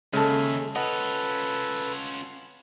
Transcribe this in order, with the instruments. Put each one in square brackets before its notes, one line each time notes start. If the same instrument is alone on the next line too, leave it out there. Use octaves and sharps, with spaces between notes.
[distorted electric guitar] D#2 [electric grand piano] C#3 [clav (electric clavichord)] G#3 A4 [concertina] E5 G#5
[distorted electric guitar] C#4 F4 [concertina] A4 B4 [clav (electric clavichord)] D#5 [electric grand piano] F#5